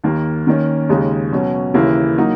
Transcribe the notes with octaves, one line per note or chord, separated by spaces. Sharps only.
D#2 D#3 A#3
D#3 A#3 C#4
D#2 C#3 G#3 D#4
B2 F#3 C#4
D#2 C#3 E3 A#3 E4
F#3 A#3 D#4